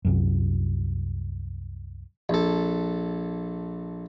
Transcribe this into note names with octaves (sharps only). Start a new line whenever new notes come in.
C2 F#2
A#1 A4